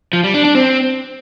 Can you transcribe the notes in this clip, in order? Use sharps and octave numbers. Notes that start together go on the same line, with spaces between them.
F3
G3
D4
D4
C4